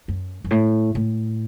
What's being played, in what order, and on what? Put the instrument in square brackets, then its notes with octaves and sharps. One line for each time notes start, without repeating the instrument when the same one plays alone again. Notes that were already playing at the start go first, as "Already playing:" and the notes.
[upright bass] F#2
F#2
A2
A2